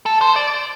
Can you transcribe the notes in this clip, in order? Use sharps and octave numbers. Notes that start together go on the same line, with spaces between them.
A4
C5
D5